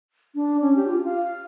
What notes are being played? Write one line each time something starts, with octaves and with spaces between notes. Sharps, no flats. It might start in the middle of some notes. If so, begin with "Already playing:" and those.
D4
C#4
G4
F4
F5